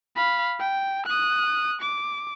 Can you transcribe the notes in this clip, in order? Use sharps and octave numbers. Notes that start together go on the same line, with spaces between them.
F5 B5
G5
D#6 F#6
D6